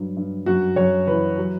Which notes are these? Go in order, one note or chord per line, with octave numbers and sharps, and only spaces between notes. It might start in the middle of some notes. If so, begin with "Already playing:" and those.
Already playing: G2 F#3
G2
F#2 F#4
F#2 C#5
E3 B4
F#3